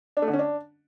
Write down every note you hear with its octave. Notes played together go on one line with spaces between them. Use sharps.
D4
A3
D3
C#4
D4